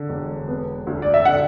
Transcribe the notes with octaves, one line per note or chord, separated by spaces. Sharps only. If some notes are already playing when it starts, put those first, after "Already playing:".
Already playing: D3
E1
B3
D2
D5
E5
D3 F#5